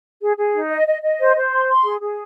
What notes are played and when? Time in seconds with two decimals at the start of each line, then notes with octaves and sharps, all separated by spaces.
0.21 G#4
0.37 G#4
0.54 D#4
0.70 D#5
0.87 D#5
1.03 D#5
1.20 C5
1.36 C5
1.52 C6
1.68 C6
1.84 G#4
2.01 G#4